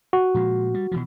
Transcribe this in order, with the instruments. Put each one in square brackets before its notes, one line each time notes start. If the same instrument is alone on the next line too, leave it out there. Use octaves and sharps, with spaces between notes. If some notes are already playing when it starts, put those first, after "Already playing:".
[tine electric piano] F#4
[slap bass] A#2 F3 G#3
G3
B2 E3 F3